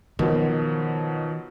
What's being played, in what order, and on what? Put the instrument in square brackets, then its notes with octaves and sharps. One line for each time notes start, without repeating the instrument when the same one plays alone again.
[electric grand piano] B2 F3 F#3 [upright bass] D#3